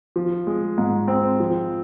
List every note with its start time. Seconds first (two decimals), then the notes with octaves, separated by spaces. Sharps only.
0.16 F3
0.47 G#3
0.78 G#2
1.08 C4
1.40 F3